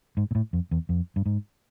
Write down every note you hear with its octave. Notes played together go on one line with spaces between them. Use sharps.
G#2
A#2
A2
F2
E2
F2
G2
G#2